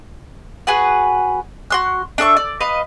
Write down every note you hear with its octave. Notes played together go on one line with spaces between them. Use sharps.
F#4 G#4 B4 F#5
F#4 C6 F#6
D4 A4 E5 C#6
D5
B4 D#5 F5